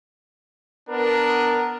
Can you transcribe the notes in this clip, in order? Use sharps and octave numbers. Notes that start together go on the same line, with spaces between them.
B3 D4 A#4